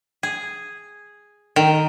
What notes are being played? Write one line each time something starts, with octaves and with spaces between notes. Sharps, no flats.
G#4
D#3